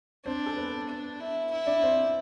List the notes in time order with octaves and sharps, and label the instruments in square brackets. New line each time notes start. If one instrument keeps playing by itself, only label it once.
[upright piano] C4 C5 [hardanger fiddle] D4
[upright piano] A4
B3 B4
[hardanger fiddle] D4
E4
E4
[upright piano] D4 D5
C4 C5